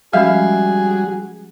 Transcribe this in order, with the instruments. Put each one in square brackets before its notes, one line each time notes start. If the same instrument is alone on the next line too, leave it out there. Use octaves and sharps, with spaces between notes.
[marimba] F3 G#3 C#4 [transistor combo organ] G3 F#4 [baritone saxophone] G#4 [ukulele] E5 F5